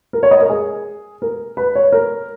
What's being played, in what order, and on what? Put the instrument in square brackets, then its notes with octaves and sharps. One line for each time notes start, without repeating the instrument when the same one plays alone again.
[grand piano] A#4
C#5
D#5
A#4
G#4
A#4
B4
C#5
A#4